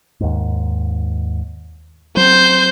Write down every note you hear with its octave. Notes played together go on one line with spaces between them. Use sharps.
D#2 G#2
F#3 C4 C5 G6